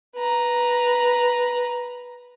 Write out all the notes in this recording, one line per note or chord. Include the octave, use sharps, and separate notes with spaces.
B4 A#5